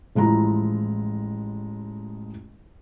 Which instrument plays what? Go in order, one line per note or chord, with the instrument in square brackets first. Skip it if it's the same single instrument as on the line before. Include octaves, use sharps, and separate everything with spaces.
[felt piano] A1 F3 G#3 E4 A#5